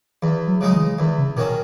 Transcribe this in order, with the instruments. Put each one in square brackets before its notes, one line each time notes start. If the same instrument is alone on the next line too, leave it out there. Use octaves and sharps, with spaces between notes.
[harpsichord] E2 [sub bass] E3
[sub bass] F#3
[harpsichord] C#3 G#3 D#4 [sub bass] F#3
[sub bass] E3
[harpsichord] E2 [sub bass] D#3
[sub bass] C#3
[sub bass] B2 [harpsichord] D#3 F#3 C#4